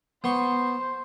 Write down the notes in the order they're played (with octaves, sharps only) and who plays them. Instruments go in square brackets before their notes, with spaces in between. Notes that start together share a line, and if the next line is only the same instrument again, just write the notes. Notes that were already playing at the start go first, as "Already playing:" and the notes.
[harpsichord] B3 C6 C#6 [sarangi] C5